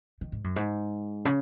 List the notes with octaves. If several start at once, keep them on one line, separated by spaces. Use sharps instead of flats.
D#3
G#2
F#2
G#2
C#3